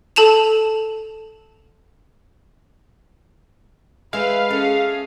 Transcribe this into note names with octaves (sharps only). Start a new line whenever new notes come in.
A4 A5 E7 F7
G#3 B4 E5 F5
C#4 G#4 A4